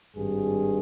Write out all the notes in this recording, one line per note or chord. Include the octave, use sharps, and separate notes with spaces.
G#1 G2 D#3 G#4